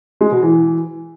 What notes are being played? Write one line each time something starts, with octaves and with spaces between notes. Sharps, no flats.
G#3
B2
E3